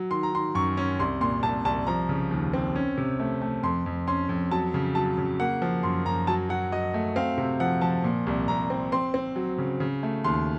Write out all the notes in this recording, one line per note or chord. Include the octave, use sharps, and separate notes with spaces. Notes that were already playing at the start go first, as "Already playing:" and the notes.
Already playing: F#3
D#3 C6
A#5
D#3 C6
F#2 C#6
C#4
C2 C6
A#2 C6
C2 A5
C2 A5
F3 A#5
C#3
D#2
C4
C#4
C3
A3
A3
F2 C6
F2
C#4 C6
F2
F#3 A5
C#3
F#3 A5
C#3
A#3 F#5
F3
F#2 C6
F#2 A#5
F#3 A5
F#3 F#5
F#3 D#5
A3
C4 F5
C3
F3 F#5
F3 A5
A#2
C2
C2 A#5
C4
C4 C6
C4
F#3
C#3
C#3
A3
D#2 C6